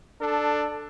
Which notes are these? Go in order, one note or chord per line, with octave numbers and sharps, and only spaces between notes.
D4 A4